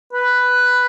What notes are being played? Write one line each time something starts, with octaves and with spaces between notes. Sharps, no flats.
B4